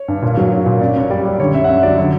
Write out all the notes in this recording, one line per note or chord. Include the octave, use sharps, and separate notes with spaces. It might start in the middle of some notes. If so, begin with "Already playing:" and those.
Already playing: C#5
G2
A#2
F#3
C#4
A#2
F#2 D5
F#2 C#5
G3 D5
G3
D3 C#5
F#2 E5
F#5
F#2 E5
F#3 D5
D3 C#5